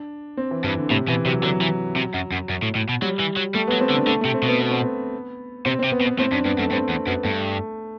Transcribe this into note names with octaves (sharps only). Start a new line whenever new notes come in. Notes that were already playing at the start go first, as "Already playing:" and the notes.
Already playing: D4
C4
E3
G2 E3
D3
A2 C3
B2 E3
C3 F#3
D3 F#3
E3
C3
F#2
F#2
F#2
A2
A2
B2
F#3 G3
E3
F#3
G3 A3
B3
F#3
C4
D3
D4
D3 A3
C3 A3
C4
B2
B3
B3
C4
B3
C3 C4
C4
C3
B3
B2
B3
A2 C4
F#2 D4
G2 B3
F#2 A3
G2 C4
E2 C4
F#2 B3
G2 A3